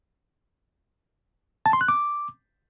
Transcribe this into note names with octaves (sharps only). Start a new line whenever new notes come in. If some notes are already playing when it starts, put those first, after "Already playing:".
A5
C6
F#6
D6